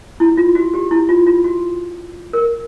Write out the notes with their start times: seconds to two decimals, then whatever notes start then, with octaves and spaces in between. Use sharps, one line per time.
0.20 E4
0.37 F4
0.55 F#4
0.74 G4
0.91 E4
1.09 F4
1.27 F4
1.44 F#4
2.33 A#4